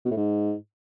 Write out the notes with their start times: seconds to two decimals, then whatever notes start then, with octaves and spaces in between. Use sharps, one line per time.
0.05 B2
0.11 A2
0.17 G#2